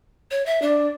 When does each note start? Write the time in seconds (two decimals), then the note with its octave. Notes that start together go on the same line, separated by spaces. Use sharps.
0.31 C#5
0.46 E5
0.62 D4 D5